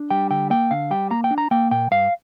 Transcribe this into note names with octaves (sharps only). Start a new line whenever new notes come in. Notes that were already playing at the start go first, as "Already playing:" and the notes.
Already playing: D4
G3 G5
D3 G5
A#3 G5
D3 F5
G3 G5
A#3 A#5
G5
D4
A#5
A#3 G5
A#2 G5
G2 F5